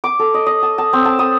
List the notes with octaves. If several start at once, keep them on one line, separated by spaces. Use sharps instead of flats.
D6
A4
D#5
D#5
A5
A5
C4
A5
D#6